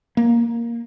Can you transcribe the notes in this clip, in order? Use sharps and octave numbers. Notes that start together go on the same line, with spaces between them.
A#3